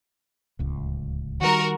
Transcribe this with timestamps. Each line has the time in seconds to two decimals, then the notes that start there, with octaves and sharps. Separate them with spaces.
0.59 D1 C#2
1.42 D#3 G3 F#4 A#4